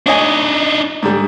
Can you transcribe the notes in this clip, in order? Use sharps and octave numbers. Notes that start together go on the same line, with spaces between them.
D4 D#4 C#5 D#5 G#5
G#2 D3 G3